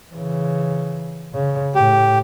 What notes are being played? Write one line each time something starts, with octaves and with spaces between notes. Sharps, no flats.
C#3 E3
C#3
A2 G4